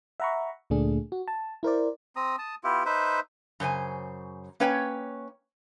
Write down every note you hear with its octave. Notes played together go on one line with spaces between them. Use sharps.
E5 F#5 A#5 B5 C#6
D2 A#2 A3 D4 G#4
F#4
A5
E4 A#4 C5 D5
C4 A#5 D#6
A5 D#6
B3 E4 F4 G4
D#4 B4 C5 E5
F#2 C#3 C5 G#5
A#3 C#4 B4 C#5 G5